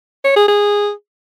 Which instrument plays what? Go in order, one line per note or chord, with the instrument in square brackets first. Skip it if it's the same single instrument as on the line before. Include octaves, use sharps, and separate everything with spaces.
[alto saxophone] C#5
G#4
G#4